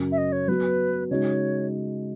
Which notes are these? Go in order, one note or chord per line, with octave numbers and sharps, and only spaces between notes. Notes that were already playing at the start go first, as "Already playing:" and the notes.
Already playing: F#2 C#3 F#3
E5
D#5
C#5
F#3 B3 F#4 B4
C#3 G#3 D#4 F#4 C#5